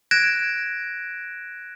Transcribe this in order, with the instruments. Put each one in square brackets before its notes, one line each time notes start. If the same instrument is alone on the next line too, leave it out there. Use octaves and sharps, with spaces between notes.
[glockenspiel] F#6 G#6 A#6 D7 E7